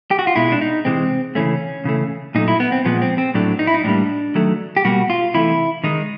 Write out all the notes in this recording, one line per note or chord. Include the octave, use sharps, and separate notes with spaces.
G4
F#4
F4
B2 G#3 E4
D4
D#4
C3 E3 G#3 C4
C#3 E3 A3 C#4
C#3 E3 A3
A#2 F#3 A3 D#4
E4
B3
C4
A#2 F3 G#3 B3
C4
C4
A2 F#3 A3 D4
D#4
E4
D#4
A2 E3 G3 A#3 D4
D#3 F#3 A3
G4
B2 G3 A#3 F#4
F4
C3 E3 A3 E4
D#3 G#3 D#4